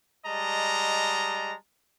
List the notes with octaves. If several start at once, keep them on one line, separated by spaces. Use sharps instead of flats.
G3 G#3 D#5 A5 A#5